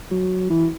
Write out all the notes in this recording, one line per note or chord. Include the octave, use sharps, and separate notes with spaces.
F#3
E3